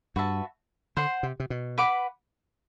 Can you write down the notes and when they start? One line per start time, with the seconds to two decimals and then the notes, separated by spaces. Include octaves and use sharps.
0.16 G2 F#4 B4 E5 A5
0.97 D3 C5 F#5 C6
1.23 C3
1.40 C3
1.50 B2
1.78 B4 F#5 B5 D6